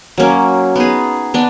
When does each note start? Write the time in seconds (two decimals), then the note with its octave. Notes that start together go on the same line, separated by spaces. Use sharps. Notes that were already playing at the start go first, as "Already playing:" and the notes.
0.18 F#3 A#3 C#4
0.76 B3 D#4 G#4
1.34 B3 D4